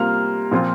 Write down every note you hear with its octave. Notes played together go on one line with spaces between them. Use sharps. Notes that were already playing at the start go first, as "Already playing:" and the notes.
Already playing: C3 G3 A#3 F4 F6
A#2 F3 C4 F4